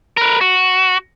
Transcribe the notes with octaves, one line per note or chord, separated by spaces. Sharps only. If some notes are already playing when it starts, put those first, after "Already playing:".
A#4 B4
F#4